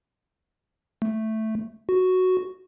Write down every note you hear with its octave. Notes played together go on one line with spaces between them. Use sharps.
A3
F#4